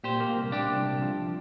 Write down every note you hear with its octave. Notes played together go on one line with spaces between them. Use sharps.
A#2 G4 C5
A#3
C2
A#2 D4 G4
C2
C2
F3